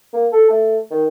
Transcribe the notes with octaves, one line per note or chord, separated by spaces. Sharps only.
A#3
A4
A3
D#3